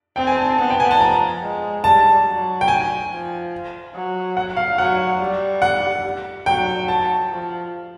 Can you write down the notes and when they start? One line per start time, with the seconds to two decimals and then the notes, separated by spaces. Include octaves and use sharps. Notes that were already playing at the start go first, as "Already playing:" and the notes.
0.16 C4 G5
0.27 G#5
0.37 A5
0.48 A5
0.58 B3
0.70 G5
0.80 G#5
0.91 A5
1.00 F3 A#5
1.42 G#3
1.84 G3 A5
2.26 F#3
2.61 G5
2.68 G#5
3.10 F3
3.94 F#3
4.37 F#5
4.57 F5
4.78 F#3 F#5
5.20 G3
5.62 F#5
6.46 F#3 G5
6.88 A5
7.30 F3